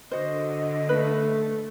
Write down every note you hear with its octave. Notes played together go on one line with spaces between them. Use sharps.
D3 F#4 C5 D#5
A3 B4